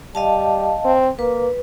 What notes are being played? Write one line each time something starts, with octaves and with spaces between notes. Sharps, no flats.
G3 D#5 F5 A5
C4
A#3 B4